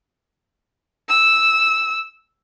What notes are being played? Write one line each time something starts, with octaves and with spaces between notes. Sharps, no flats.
E6